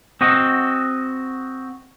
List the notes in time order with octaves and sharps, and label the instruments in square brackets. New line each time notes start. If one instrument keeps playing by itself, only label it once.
[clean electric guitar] C4 F#4 D#5